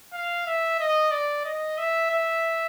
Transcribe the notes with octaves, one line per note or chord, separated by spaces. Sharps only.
F5
E5
D#5
D5
D#5
E5
E5